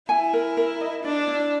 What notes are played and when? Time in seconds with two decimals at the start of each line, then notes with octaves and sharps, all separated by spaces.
0.09 E4 G#5
0.33 A#4
0.57 A#4
0.81 D#5
1.04 D4 D5
1.27 E4